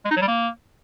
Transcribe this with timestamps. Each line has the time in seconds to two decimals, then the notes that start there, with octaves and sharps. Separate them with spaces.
0.05 G#3
0.11 D#4
0.16 F#3
0.22 G3
0.28 A#3